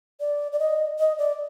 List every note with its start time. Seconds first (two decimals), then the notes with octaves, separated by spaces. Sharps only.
0.20 D5
0.52 D5
0.60 D#5
0.99 D#5
1.18 D5